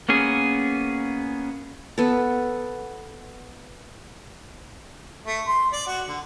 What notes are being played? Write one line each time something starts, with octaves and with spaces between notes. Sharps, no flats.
A#3 B3 C#4 G#4
B3 A4
A3
C6
D5
F#4
D3